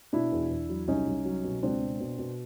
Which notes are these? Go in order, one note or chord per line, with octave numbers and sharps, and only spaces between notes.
B2 D4 E4
E2
E2
F#3
C2 C#4 D#4
C2
F#3
B2
C#2 C4 D4
B2
B2
B2